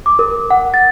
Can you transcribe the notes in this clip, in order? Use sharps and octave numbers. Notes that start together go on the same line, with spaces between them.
D6
A#4
F#5
A6